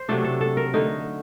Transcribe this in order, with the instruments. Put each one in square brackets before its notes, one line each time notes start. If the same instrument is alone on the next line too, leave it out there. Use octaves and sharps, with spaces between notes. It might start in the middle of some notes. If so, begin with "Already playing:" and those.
Already playing: [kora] C5
C3 F#3 A3 D4 A4
A4
A4
A#4
D3 A3 D#4